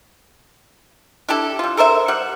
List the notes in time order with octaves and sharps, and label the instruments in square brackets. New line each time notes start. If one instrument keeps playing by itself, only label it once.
[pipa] D4 E4 G4 A4
G3 F4
A4 A#4 C5 E5
G3 F#5